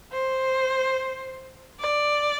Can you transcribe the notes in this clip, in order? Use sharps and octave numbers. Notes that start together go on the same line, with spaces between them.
C5
D5